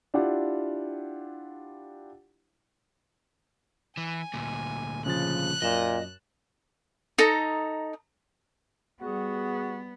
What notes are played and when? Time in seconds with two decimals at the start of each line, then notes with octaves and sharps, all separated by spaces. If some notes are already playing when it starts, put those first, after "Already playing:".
0.14 D4 E4 F4 G4 F#5
3.97 E3 G#5
4.33 D2 A#2
5.06 C#3 F3 F#6 A6
5.62 F#2 A#2 D#5 E7
7.18 D#4 A4 A#5
9.01 G3 B3 F#4 G#4